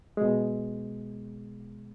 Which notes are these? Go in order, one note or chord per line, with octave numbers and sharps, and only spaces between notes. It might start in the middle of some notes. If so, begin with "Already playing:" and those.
B2 G#3